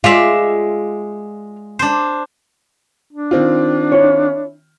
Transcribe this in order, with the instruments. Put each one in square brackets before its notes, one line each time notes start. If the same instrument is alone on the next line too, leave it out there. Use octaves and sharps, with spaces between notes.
[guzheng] G#3 D5 E5 [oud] F4
[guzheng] D4 C5
[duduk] D4
[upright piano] D#3 C4 F4
[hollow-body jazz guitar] E4 C#5